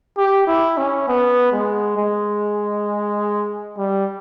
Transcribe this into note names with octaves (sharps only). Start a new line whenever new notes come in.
G4
E4
C#4
B3
G#3
G#3
G3